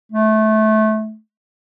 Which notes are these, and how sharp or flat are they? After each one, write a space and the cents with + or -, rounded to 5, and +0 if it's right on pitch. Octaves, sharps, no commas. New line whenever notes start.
A3 -20